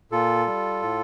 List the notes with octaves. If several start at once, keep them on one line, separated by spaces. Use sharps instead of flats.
A#2 F4 A4
G3
A2